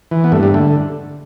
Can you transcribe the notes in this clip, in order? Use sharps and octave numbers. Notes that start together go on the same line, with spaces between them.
E3
B3
G2 A3
G3
D3 A3